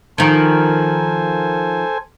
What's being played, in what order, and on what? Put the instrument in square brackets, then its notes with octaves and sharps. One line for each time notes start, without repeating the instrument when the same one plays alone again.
[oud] D#3 F3 [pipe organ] A4 C5 G#5